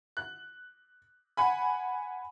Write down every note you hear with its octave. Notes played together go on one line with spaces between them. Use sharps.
F#6
F#5 G#5 B5